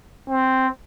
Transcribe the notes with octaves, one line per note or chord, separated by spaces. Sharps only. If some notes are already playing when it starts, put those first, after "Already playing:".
C4